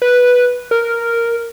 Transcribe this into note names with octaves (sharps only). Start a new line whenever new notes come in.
B4
A#4